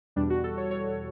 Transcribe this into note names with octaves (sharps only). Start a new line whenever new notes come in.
E2 B2 G3 D4
F#4
A4
C#5
C#5